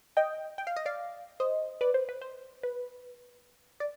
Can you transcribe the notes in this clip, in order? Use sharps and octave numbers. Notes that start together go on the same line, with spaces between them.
D#5 G5
G5
F5
D#5
D5 F5
C5 D#5
B4 D5
C5
B4
C5
B4
D5